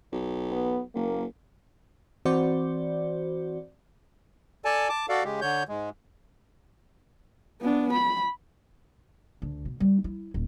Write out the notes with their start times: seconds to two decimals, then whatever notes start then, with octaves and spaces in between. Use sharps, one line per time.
0.12 B1
0.52 B3
0.95 F#1 A#3
2.25 E3 C4 F#4 C5 D5
4.65 A4 D5 G#5 A5
4.89 A5 D6
5.09 F#4 A4 D5 F5
5.24 C#3 G#3 G4
5.41 D3 C#5 G6
5.69 G#2 G#3
7.61 B3 D4
7.93 B5
9.42 D2
9.65 B2
9.80 G3
10.04 E4
10.34 D#1